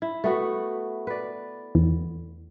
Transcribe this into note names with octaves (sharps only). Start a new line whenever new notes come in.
E4
A3 B3 F#4
B4 D5
E2